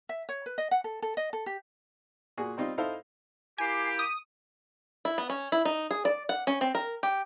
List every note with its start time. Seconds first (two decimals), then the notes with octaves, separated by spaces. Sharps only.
0.09 E5
0.29 C#5
0.46 B4
0.58 D#5
0.71 F#5
0.84 A4
1.02 A4
1.17 D#5
1.33 A4
1.46 G4
2.37 A#2 F#4 G#4
2.57 G3 C4 D#4 F4
2.78 D#4 E4 A4 C5 F5
3.58 A#3 E4 G4 G#5 C7
3.99 D#6
5.05 E4
5.18 B3
5.30 C#4
5.52 E4
5.65 D#4
5.91 G#4
6.05 D5
6.29 F#5
6.47 C#4
6.61 C4
6.75 A#4
7.03 G4